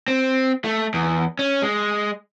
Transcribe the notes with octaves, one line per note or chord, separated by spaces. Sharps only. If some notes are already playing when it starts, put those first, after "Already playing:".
C4
A3
E2
C#4
G#3